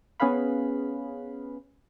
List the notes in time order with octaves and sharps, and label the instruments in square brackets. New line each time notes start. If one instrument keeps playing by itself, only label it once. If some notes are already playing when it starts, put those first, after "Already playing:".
[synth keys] B3 C#4 G#4 B4 F5 B5